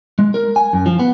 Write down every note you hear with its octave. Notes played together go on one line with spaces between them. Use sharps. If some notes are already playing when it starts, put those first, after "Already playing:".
G#3
A#4
G#5
F#2
F3
B3